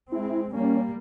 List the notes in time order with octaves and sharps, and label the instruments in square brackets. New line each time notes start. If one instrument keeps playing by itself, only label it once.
[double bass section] G#3 C4 [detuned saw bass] E4
[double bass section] G3 A#3 [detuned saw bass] C#4